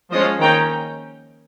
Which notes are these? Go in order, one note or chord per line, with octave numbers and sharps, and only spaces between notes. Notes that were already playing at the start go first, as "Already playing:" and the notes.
F3 G#3 C#4 C5 D#5
D#3 A#3 C#4 G5 A#5